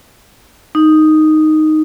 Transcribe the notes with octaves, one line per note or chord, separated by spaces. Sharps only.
D#4